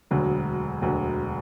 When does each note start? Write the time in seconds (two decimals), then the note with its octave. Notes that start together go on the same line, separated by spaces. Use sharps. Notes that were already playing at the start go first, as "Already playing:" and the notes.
0.11 E1 D2 D3 F#3
0.82 E1 D2 D3 F#3